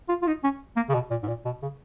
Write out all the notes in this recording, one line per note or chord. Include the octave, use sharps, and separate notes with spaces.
F4
F4
D#4
C#4
A#3
C#3
B2
A#2
G#2
A#2
B2
C#3